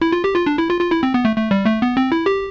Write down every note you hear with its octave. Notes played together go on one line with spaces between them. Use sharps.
E4
F4
G4
F4
D4
E4
F4
F4
E4
C4
B3
A3
A3
G3
A3
B3
C4
E4
G4